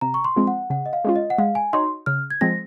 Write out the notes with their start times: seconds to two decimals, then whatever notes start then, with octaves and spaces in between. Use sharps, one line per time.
0.01 C3 A#5
0.14 C#6
0.24 C6
0.36 F3 G#3 C4
0.47 F#5
0.70 C#3 F#5
0.86 D#5
0.93 F5
1.05 G#3 C#4 F4
1.16 D#5
1.30 F#5
1.38 G#3 F5
1.55 G#5
1.73 D#4 F#4 C#5 C6
2.06 C#3 F6
2.30 G#6
2.41 F3 G#3 C4 A#6